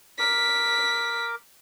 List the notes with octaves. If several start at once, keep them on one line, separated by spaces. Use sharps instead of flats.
A#4 D6 B6